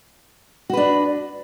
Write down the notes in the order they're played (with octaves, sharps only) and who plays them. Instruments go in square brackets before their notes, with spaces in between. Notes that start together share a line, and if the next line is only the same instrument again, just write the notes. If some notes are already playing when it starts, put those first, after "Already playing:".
[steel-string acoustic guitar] F#4
B4
D4